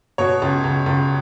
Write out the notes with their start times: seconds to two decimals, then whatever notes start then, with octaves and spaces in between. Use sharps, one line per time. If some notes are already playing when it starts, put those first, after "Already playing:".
0.18 B2 C#5
0.42 C#2
0.64 C#2
0.86 C#2